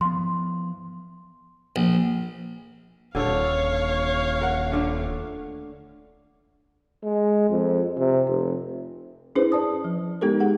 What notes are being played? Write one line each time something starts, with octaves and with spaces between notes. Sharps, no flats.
F3 B3 C6
A#1
D#1 D3 A4 C#5 F5
A#4 F#5
D3 A3 D4
G#3
F2
C3
F1
C#4 D4 E4 G#4 B4 C5
D5 A5 D#6
F3
G#3 B3 D#4 G4 A4 A#4
G#4 F#5